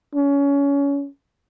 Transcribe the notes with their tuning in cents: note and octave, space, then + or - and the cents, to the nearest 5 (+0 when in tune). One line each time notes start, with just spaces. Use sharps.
C#4 +25